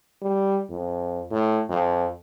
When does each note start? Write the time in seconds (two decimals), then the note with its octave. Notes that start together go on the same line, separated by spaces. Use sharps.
0.22 G3
0.70 F2
1.31 A2
1.69 F2